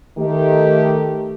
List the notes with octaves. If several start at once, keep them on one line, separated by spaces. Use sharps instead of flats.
D#3 A3 G4